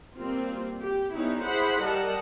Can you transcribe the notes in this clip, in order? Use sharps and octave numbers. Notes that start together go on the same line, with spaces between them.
G3 A#3 C4 F4
G4
G3 B3 C#4 D#4 E4
E4 G#4 C5 F#5 B5
G3 A#4 D#5 F#5 A5